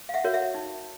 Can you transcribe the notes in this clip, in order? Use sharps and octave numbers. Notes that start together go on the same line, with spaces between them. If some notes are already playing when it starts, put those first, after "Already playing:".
F5
E5 F#5
F#4 A#4 C#5
E5 F#5
D#4